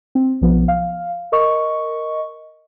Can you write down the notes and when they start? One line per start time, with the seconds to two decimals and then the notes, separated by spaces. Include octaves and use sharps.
0.15 C4
0.41 B1 F3 B3
0.68 F5
1.32 A#4 D#5 C#6